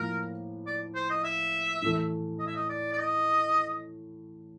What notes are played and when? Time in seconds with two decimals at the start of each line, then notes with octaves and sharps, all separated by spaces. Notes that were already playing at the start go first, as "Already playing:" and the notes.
Already playing: A2 F3 A#3 A#4
0.67 D5
0.95 C5
1.10 D#5
1.24 E5
1.82 A2 E3 A3
2.40 D#5
2.47 E5
2.56 D#5
2.69 D5
2.93 D5
2.98 D#5